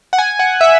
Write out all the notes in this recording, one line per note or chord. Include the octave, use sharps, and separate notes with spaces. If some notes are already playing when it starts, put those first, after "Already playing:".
F#5
G#5
F#5
E5